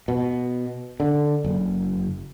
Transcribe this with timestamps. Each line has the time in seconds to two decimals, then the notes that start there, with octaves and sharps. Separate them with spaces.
0.08 B2
1.00 D3
1.44 F#1